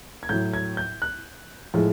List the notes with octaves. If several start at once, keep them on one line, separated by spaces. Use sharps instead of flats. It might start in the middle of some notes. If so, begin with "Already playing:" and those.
G#6
A2 F#3 G6
G#6
G6
F#6
A2 F3 G#3